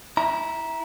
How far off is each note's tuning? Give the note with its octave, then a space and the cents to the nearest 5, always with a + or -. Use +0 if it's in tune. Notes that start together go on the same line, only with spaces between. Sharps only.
E4 -5 A#5 +20